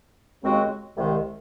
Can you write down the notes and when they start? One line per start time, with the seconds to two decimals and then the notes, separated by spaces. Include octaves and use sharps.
0.42 D#2 C#3 G#3 C4 F#4
0.96 C2 C3 D#3 G#3